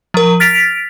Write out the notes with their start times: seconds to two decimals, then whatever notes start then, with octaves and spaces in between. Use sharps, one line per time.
0.14 F3 A#4
0.40 F6 A6 B6 D7 F7